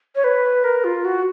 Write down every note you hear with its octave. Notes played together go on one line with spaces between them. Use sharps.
C#5
B4
A#4
F4
F#4